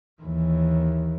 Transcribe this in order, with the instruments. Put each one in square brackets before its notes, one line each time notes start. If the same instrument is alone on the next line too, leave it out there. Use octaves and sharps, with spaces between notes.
[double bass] D#2 E3